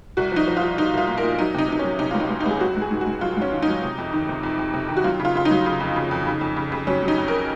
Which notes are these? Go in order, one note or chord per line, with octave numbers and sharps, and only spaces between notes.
C2 F#4
F3 D#4
F3
F4
F3
C2 D#4
C2 F4
A#2
A#4
A#2
F#3 D#4
C3 D#4
C3 D#4
F#3 C#4
C3 D#4
C#2 F4
D#4
C#2
D#4
C#2 G#4
F#3 F#4
G#2
G#4
G#2
F#4
G#2
F#3 F4
G#2
C#4
D#3
F#3 D#4
C3
F2
D#3
C3
F2
F2
C3
D#3
F#4
F#3 F4
C#3
F4
C#3 F4
D#4
F#3
C#3
F2
C#3
F2
C#3
F2
C#3
C#3
F#3 C#4
F#3
D#4
F2
A#4